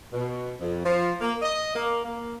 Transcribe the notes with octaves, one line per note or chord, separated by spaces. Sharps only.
B2
F2
F3
A#3
D#5
A#3
A#3